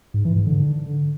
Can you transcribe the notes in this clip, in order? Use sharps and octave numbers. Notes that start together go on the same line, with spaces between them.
G#2
E3
G#2
D3